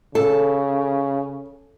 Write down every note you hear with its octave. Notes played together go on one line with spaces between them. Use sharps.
C#3 A4